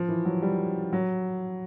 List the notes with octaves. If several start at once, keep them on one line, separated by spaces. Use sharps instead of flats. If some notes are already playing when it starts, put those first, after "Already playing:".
Already playing: F3
E3
F#3
G3
F#3